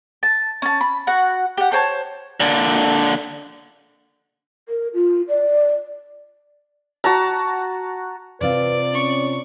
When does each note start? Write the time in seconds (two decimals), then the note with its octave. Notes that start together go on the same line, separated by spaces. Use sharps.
0.23 A5
0.62 C#4 A5
0.81 B5
1.07 F#4 F#5
1.57 G4 F#5
1.72 A4 C5 C#5 A5
2.40 A#2 D3
4.69 A#4
4.94 F4
5.28 D5
7.04 F#4 A5 A#5
8.41 C3 C4 F4 B4 D5
8.94 C#4 C#6